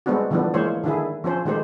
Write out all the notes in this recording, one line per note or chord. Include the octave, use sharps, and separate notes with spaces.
G3 G#3 B3 C4 D4 F#4
D3 E3 F3 G3 B3 D4
E3 G#3 A#3 C5 C#5
D3 D#3 D4 E4 G#4
F3 C4 C#4 C5
D#3 G#3 A3 G4 C5